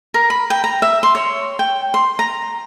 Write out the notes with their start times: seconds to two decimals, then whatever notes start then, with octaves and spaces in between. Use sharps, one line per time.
0.14 A#4
0.30 B5
0.50 G5
0.64 A#5
0.82 E5
1.03 C6
1.15 C#5
1.59 G5
1.94 C6
2.19 A#5